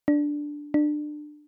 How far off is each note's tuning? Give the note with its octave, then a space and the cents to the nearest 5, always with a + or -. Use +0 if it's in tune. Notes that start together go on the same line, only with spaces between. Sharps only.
D4 +0
D4 +25